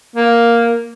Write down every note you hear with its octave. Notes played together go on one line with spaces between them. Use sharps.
A#3